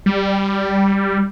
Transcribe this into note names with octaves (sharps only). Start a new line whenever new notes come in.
G3